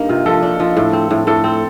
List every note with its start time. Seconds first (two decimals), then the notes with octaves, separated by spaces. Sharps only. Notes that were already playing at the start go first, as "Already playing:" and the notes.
Already playing: G2 A#3 D#4
0.09 C3 F4
0.26 F3 A4
0.43 D4
0.60 F3
0.77 A2
0.93 C4
1.11 A2
1.27 A2 A4
1.44 C4